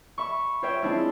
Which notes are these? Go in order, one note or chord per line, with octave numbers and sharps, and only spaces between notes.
E5 B5 C#6
F4 C5 C#5 E5 G5
G#3 C4 D4 E4 F4 E5